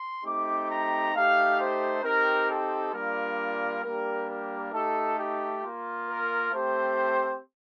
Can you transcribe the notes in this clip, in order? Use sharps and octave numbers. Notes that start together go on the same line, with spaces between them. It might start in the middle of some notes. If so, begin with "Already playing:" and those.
Already playing: C6
A3 C4 D#4 G4 D6
A#5
A3 D#4 G4 F5
C5
C4 D#4 G4 A#4
A4
G3 A#3 D4 F4 A#4
G3 A#3 D4 G4 A#4
A#4
A3 D#4 G4 A4
G4
A#3 F4
A#4
A3 C4 G4 C5